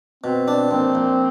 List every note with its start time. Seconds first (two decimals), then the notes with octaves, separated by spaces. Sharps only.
0.24 B2 C4
0.48 D4
0.71 A#1 C4
0.95 A#1